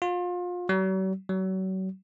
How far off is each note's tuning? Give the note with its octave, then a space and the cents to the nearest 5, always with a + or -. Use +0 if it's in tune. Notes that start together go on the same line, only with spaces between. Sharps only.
F4 +30
F#3 +45
F#3 +35